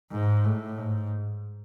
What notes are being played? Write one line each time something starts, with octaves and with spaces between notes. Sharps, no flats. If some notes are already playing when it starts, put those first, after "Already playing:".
G#2
A2
G#2